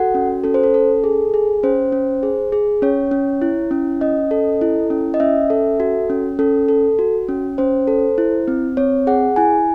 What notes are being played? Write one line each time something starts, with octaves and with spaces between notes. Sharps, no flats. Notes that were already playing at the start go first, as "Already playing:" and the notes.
Already playing: F#4 A4 F#5
C#4
C#4 A4
C5
A4
A4
G#4
G#4
C#4 C5
C#4
G#4
G#4
C#4 C#5
C#4
E4
C#4
C#4 D#5
A4
E4
C#4
D#5
C#4 E5
A4
F#4
C#4
C#4 A4
A4
F#4
C#4
C#4 C5
A4
E4
C4
C4 C#5
G#4 F#5
E4 G#5